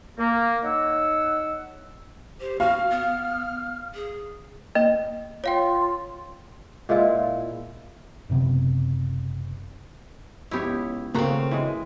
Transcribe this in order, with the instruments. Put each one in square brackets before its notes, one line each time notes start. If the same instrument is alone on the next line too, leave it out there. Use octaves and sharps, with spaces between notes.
[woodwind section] A#3
D#4 C#5 F#5 E6
[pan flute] G4 [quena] C5
[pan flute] F#4 [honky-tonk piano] F5 [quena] F6
[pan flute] B3
G#4
[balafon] A#3 [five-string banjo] D#5
[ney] F4 [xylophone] C#5 F5 G5
[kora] A#2 G#3 E4 F4
[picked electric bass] F#1 C3 B3
[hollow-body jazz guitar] C#2 B3 [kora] E4 G4 C#5
[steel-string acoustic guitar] C#3 C4 [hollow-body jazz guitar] A3 F#4 A#5 [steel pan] A#3
[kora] E3 G#3